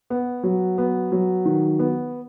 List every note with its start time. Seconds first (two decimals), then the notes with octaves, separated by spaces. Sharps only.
0.10 B3
0.43 F#3
0.78 B3
1.12 F#3
1.45 D#3
1.79 B3